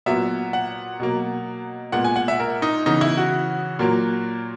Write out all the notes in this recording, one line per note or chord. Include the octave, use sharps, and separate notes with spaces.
A#2 F#3 B3 E5
F#5
B2 F#3 A#3
A#2 G#3 B3 F#5
G#5
F#5
E5
A#4
D#4
C#3 E3 B3 D#4
E4
F#4
A#2 F#3 A#3